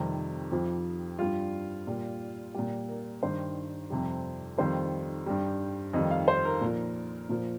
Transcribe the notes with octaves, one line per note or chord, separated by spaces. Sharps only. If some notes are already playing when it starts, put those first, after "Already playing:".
Already playing: F2 C3 D#3 G3 G4
F2 F3
G2 G3 F4
A#2 G3
A#2 G3 G4
A#4
G2 D#3 G3 C5
F2 C3 G3
F2 D#3 G3 C5
G2 G3
F2 D#3 G3 D#5
F5
C5
A#4
A#2 F3
A#2 F3